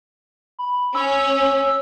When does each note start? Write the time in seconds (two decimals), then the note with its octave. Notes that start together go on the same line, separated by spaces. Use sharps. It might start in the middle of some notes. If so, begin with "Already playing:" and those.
0.59 B5
0.95 C#4 E6